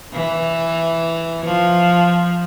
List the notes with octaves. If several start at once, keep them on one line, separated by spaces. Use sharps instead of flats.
E3
F3